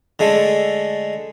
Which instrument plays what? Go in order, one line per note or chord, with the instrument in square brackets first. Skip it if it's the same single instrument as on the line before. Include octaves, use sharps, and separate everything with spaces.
[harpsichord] D3 G#3 A3